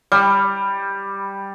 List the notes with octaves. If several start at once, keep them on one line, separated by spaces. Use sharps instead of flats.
G3